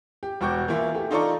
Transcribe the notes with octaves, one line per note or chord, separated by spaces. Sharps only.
G4
E1 F#4 G5 C#6 D6 G6
E3 A#3 E4 F4
E3 A3 G4
D#4 F4 A4 D5 A#5 C#6